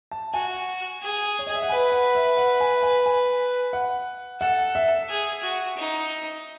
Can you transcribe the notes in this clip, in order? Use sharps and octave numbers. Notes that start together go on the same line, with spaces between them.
A5
F#4 G#5
G#4
C#5
D#5
E5
F#5
B4 G#5
F#5
E5
F#5
G#5
G#5
G#5
F#5
A4 F#5
E5
G#4
F#4
D#4